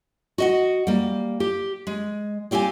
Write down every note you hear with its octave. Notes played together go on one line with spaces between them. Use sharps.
F#4 D#5 F#5
G3 A#3
G4
G#3
G3 C4 G4 F5 G#5